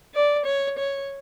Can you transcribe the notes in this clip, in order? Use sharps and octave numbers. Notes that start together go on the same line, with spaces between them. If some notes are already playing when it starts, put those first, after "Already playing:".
D5
C#5
C#5